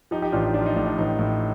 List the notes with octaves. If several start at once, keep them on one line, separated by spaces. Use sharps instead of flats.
F3 D#4 G4
D#4 G4
A1 D4 F4
D#4
F3 D4
F4
D#4
A2 D4
D4
A1 D#4
A2